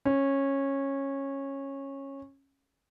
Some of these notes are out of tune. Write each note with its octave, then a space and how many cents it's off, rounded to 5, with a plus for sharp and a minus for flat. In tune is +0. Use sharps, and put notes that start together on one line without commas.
C#4 -15